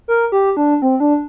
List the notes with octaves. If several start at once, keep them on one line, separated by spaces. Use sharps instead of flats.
A#4
G4
D4
C4
D4